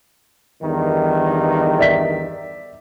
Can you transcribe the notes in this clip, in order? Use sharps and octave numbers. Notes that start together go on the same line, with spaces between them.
E2 G2 D#3
D5 E5 B6